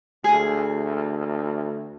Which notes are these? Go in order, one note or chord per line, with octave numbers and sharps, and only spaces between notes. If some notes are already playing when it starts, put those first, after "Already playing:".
D2 G#4